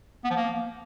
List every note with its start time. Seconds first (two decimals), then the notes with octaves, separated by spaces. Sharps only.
0.24 B3
0.30 F3
0.37 A#3